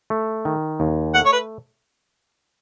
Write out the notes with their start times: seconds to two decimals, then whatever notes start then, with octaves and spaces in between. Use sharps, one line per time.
0.10 A3
0.45 D#3
0.80 D#2
1.14 A3 F#5
1.25 C#5
1.32 B4